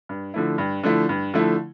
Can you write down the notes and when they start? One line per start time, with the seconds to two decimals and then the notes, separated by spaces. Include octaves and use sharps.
0.09 G2
0.34 D3 F3 A3 E4
0.58 G2
0.83 D3 F3 A3 E4
1.09 G2
1.34 D3 F3 A3 E4